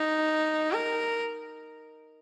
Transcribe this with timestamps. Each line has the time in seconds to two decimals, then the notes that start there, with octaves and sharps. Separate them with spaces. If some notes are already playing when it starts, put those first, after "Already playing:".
Already playing: D#4
0.72 A#4